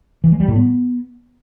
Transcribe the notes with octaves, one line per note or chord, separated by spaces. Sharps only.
E3
G#3
G3
A2
B3